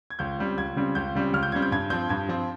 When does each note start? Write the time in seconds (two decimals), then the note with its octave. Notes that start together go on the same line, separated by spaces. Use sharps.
0.10 G#6
0.19 C#2 G6
0.39 C#3 G3 C4
0.58 C#2 G#6
0.76 C#3 G3 C4
0.95 C#2 G6
1.15 C#3 G3 C4
1.33 C#2 F6
1.43 G6
1.52 C#3 G3 C4 G#6
1.62 G6
1.72 G2 G#6
1.90 F3 C4 G6
2.09 G2 G#6
2.29 F3 C4